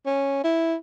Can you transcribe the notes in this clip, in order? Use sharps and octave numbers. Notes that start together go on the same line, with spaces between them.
C#4
E4